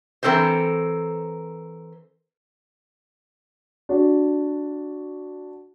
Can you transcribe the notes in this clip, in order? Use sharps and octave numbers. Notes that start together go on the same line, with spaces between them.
E3 C4 A4 A#4 C5
D4 F#4